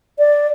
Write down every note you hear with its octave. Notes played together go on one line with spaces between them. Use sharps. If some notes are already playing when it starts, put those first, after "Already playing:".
D5